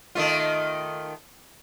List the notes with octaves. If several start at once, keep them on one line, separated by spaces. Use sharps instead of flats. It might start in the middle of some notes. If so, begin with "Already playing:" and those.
D#3 A3 F4